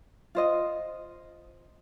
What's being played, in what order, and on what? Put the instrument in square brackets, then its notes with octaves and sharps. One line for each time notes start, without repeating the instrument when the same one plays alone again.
[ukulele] F4 C5 D#5